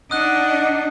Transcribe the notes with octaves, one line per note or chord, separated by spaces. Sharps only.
D4 D#4 F#5 D#6 F#6